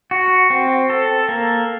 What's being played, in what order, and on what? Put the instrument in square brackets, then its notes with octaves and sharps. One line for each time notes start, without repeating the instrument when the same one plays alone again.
[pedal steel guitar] F#4
C4
A4
A#3